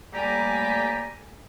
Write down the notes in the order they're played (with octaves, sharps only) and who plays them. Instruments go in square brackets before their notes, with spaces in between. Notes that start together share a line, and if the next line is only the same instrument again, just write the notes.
[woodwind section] D#2 D5 A#5 [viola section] G3 A3 G#5 [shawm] G4